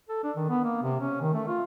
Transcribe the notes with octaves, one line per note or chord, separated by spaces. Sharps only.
A4
D4
D#3
B3
A#3
C3
C#4
D#3
A3
F4